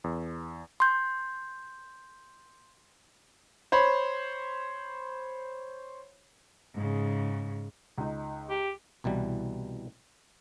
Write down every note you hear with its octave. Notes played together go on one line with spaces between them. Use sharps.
E2
C6 G6
C5 C#5 B5
G#2 C#3
C#2 D#4
G4
C2 B2 E3 G3